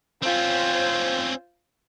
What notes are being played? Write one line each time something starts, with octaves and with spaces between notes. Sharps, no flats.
C4 C#4 F4 C5